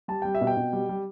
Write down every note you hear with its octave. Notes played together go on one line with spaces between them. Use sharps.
G3 A5
G3 G5
E5
B2
G5
B2
G3
G3